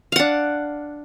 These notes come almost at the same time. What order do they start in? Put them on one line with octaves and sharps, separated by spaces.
F5 F#5 D4